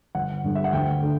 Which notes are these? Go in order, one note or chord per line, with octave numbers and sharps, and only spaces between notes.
G1 F#5
G2 D3 G3
E5
F#5
D2 G5
D3